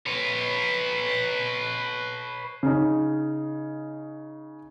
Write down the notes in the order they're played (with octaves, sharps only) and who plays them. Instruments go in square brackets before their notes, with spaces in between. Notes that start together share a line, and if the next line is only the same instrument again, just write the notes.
[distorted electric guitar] B4 C#5
[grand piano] C#3 D#4